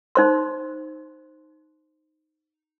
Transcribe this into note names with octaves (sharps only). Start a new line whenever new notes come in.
D#4 C5 C6